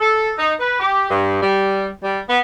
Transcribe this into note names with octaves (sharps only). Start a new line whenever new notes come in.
A4
D#4
B4
G4
G2
G3
G3
B3